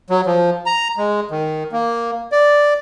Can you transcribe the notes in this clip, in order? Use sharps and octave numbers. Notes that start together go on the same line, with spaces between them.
F#3
F3
A#5
G#3
D#3
A#3
D5